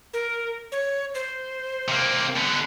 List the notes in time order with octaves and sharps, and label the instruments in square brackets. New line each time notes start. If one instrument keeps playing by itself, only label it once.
[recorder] A#4
C#5
C5
[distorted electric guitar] C3 A#3
D3 B3